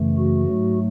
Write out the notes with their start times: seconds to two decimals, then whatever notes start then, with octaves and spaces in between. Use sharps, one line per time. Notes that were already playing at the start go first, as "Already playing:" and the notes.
Already playing: F#2 C#3 E3 A3
0.17 F#4
0.46 G#2 F#3 A3